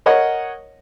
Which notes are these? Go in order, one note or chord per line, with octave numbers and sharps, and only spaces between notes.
A#4 C#5 D#5 F#5